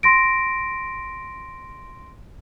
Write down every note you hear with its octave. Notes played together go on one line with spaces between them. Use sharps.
C6 A#6 D7